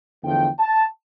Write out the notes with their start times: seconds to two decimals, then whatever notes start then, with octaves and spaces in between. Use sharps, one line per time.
0.23 E2 D3 F3 A3 G5
0.59 A5